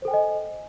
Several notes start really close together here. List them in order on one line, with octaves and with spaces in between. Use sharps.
C5 A4 G5 G#5 D#5